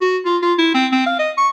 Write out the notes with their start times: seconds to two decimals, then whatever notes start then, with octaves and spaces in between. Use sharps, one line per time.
0.01 F#4
0.26 F4
0.42 F4
0.59 E4
0.74 C4
0.92 C4
1.06 F5
1.19 D#5
1.38 C#6